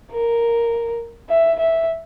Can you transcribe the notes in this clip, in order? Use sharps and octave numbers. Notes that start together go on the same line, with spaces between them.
A#4
E5
E5